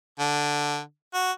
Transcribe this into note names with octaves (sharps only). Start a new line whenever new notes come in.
D3
F#4